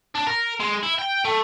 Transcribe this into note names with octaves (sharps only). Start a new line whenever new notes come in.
D4
A#4
G#3
E4
G5
A3